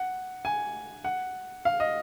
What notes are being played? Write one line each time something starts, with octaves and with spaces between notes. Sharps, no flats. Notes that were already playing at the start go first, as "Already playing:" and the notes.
Already playing: F#5
G#5
F#5
F5
D#5